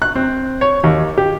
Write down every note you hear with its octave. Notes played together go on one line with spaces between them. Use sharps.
F#6
C4
C#5
D#2
G4